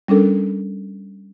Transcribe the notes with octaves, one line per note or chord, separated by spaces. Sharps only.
G3 C#4 D4 A4 A#4